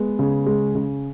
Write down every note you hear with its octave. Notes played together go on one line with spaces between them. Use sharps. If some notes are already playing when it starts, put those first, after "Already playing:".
Already playing: G#3 B3
C#3
G#3
C#3